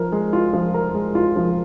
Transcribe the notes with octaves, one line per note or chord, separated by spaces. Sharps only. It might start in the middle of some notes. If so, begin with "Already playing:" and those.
Already playing: F3 A#4
G#3
F4
F3
A#4
G#3
F4
F3